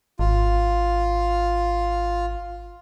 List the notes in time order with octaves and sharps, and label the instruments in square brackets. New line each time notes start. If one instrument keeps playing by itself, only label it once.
[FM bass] G#1 [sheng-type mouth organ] F4